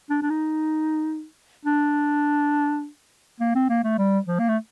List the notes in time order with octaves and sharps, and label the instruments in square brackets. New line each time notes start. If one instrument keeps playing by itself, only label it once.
[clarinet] D4
D4
D#4
D4
A#3
C4
A#3
A3
G3
F3
A#3
A3